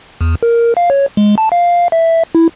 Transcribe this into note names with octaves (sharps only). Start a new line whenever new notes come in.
E2
A#4
F5
C#5
G#3
A5
F5
E5
E4